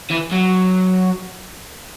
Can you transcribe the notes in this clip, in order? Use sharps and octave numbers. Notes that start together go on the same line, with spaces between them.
E3
F#3